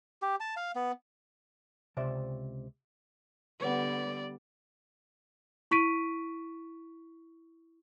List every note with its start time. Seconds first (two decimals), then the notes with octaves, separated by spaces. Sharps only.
0.22 G4
0.40 A5
0.57 F5
0.76 B3
1.97 C#2 C3 C5 D5 E5
3.61 D3 G3 B3 B4 D5 F#5
5.71 E4 C#6 B6 D7 D#7